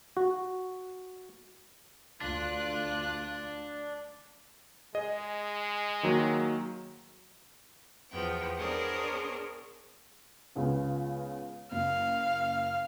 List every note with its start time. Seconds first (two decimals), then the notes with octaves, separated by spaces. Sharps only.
0.17 F#4
2.21 D2 D4 F4 F#6
4.95 G#3 G#4 D#5
6.03 D#3 F#3 A#3
8.10 E2 F3 B3 G5
8.57 B3 D4 G#4 A#4 C5 C#5
10.56 C#2 C#3 B3
11.72 F#1 F5